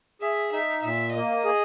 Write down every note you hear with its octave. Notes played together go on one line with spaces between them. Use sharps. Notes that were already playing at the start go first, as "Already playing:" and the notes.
G#4 E5
D#4 E5
A#2 E5
A#3 D#5
G#4